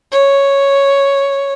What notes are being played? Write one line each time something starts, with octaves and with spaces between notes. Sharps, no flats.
C#5